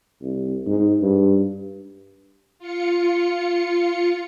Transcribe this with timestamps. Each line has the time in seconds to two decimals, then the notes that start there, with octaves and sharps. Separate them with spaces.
0.22 C2
0.66 G#2
1.02 G2
2.59 F4 C#7